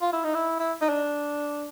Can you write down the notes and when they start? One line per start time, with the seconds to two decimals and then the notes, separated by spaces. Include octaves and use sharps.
0.02 F4
0.13 E4
0.24 D#4
0.34 E4
0.60 E4
0.82 D#4
0.89 D4